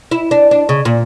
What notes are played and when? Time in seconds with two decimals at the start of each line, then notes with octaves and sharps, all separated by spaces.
0.11 E4
0.31 D4
0.51 D4
0.69 C#3
0.85 A#2